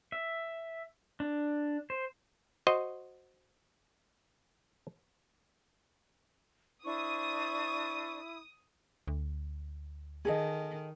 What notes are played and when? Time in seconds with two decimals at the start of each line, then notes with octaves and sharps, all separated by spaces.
0.12 E5
1.20 D4
1.90 C5
2.67 F#4 C5 D#5
6.84 D4 E4 C5 C#6 D#6
9.08 D2
10.25 D#3 G#4 A4 D#5